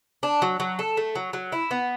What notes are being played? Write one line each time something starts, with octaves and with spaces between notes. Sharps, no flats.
D4
F#3
F#3
A4
A3
F#3
F#3
E4
B3